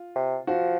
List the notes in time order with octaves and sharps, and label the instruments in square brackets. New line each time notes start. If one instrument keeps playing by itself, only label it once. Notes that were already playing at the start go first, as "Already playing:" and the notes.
Already playing: [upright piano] F4
[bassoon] C3
[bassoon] F3 [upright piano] F#4